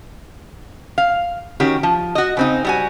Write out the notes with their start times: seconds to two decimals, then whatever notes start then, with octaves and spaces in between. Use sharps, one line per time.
0.98 F5
1.60 D#3 C#4 F#4 G4
1.83 F3
2.15 F#4 D#5
2.37 C#3 C4 D#4
2.65 G3 F#4 G#5